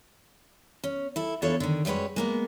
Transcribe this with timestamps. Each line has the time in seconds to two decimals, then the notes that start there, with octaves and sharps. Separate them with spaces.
0.84 C#4
1.16 E4 A4
1.42 E2 D4 E4 F4 A4 C#5
1.60 D3 D#3
1.85 F#2 G3 G#3 B4 C#5
2.16 G#3 A#3 B3